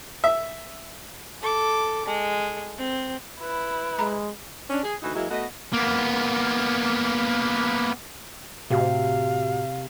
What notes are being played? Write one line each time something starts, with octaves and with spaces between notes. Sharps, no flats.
E5
A4 D6
G#3
C4
E4 B4
G#3 A#5 B5
C#4 D4
G#4
D2 E3 D#4 F#4
E3 F#3 G#3 A#3 E4 F#4
A3 B3 F#4 D#5
A#3 B3
A2 C3 F#4 G4 F5